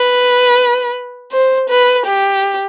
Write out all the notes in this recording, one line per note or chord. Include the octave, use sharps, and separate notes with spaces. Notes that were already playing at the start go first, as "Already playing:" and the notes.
Already playing: B4
C5
B4
G4